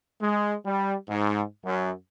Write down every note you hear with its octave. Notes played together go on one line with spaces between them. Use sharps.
G#3
G3
G#2
F#2